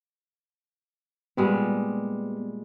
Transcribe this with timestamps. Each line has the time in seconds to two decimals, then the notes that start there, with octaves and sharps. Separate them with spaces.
1.37 A#2 G3 G#3 B3